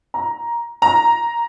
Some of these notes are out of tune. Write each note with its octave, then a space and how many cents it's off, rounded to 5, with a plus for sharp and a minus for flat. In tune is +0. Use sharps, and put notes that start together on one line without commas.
A#5 +10
A#5 +0